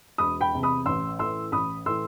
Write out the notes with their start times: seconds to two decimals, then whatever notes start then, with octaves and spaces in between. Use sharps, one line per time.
0.18 E1 B5 D#6
0.41 G5 B5
0.53 E2 C3
0.63 B5 D#6
0.86 A1 C6 E6
1.19 A2 E3 C6 E6
1.52 A1 B5 D#6
1.86 A2 E3 C6 E6